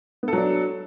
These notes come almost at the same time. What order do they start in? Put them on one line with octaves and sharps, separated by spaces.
B3 A4 F#3 D4